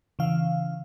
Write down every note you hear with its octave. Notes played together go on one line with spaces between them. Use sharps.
C#3 E3 F5